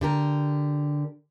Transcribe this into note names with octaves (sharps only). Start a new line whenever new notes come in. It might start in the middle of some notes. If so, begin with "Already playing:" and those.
D3 G4 A#4